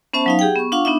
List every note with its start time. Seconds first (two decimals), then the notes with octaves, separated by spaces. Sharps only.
0.13 B3 C#4 C5 E5 A5
0.26 F#3 D#4 F5
0.39 G4 G#4 F#5 G5
0.56 B3 C#6
0.72 D4 F4 F5 F#5 C#6
0.85 B3 D4 D#4 E5